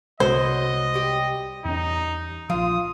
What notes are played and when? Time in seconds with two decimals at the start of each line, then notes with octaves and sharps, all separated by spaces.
0.20 C2 C3 F#3 G#3 B3 C5 D#5
0.94 G3 G4
1.65 E2 C#4 D#4
2.50 A#1 F3 F4 D#6